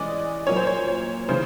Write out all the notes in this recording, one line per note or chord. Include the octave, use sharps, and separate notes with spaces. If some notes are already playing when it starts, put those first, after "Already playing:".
Already playing: E3 G#3 C#4 D5 D#5
A#2 F#3 A#3 C#4 C#5
C5
C#5
C#5
C#3 E3 C5